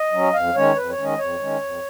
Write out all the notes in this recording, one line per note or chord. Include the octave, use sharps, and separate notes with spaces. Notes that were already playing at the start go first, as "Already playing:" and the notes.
Already playing: D#5
F#3 C#4
F2 F5
D#3 G#3 C#4 C#5
F2 B4
C#5
D#3 G#3 C#4
D#5
F2 C#5
D#3 G#3 C#4
F2